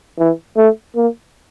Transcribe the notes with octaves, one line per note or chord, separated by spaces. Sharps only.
E3
A3
A#3